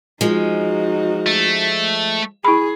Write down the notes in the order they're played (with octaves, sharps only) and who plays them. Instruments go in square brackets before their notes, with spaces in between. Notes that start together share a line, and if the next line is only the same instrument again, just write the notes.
[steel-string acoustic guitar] F3 G#3 [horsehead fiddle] D#4 F#4
[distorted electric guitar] A3
[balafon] E4 B5 [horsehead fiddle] G#4